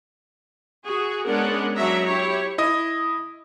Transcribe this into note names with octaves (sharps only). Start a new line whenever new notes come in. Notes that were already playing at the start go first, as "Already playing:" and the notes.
F#4 G#4
G#3 B3 C#4 D4 A#4 F#5
F#3 D4 E5 A#5
E4 G4 C#5
E4 D#5 D#6